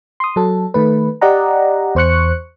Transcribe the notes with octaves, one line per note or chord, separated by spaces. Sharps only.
C6 D#6
F#3 A4
D#3 A3 B4
G4 D5 D#5 F#5 A#5
E2 C5 C#6 F#6 C#7